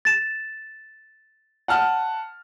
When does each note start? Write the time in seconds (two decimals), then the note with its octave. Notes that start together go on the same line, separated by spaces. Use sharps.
0.05 A6 E7
1.68 F#5 A5 F6